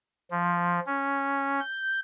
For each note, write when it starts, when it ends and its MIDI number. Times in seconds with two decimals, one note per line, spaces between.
0.31 0.80 53
0.86 1.60 61
1.60 2.00 91